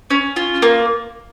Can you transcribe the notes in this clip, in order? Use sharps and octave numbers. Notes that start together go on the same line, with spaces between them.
C#4
F4
A#3